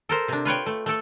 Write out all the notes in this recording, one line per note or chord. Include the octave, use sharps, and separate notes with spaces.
A4 A#4 C5
C3 D4
F4 B4 C#5 G5
A3
A3 A4